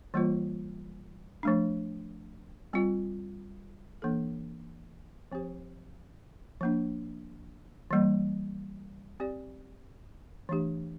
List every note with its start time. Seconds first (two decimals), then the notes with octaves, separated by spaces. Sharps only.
0.14 E3 G3 A#3 F4 C5
1.43 F3 A3 D4
2.73 G3 C4 F4
4.02 E3 A#3 D4 A4
5.32 F3 C4 G4 C5
6.61 F3 A#3 D4
7.91 E3 G3 A#3
9.20 C4 G4 D5
10.49 E3 A3 D4 G4